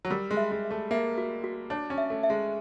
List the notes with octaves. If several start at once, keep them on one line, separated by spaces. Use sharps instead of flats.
F#3
G3 A#4
G#3
E5
G#3
E5
A3
A#3 E5
F#4
F#4
D4 C#5
C#4
E5
A3
E5
G#3